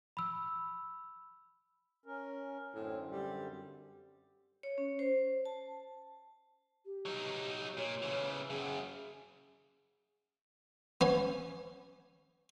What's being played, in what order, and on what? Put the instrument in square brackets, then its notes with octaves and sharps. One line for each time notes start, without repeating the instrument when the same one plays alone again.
[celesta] B5 E6
[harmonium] C#4 A#4
[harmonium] F#2 D3 C4 [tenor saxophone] A2
[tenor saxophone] G3
[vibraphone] C#5
C#4
C5
A5
[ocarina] G4
[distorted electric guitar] F#3 D#4
[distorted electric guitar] A#2 [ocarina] C#5
[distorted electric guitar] C#3 E3
[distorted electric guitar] F#2 C#3 [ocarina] G#4
[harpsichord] B3 C#4 G#5